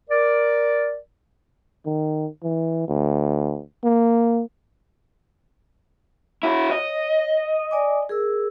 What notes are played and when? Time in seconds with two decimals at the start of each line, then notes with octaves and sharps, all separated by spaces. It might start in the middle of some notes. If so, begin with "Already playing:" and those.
0.09 A#4 D5
1.86 D#3
2.43 E3
2.88 D2
3.84 A#3
6.43 E4 F#4 C#5
6.71 D#5
7.71 D5 G#5 D6
8.09 G#4 A#4 E6